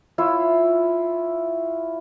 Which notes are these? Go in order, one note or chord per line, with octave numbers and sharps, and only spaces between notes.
E4 F4 C#5 E5